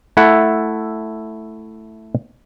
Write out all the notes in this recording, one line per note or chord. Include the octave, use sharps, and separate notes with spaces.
A3 E4 A4 E5 F#5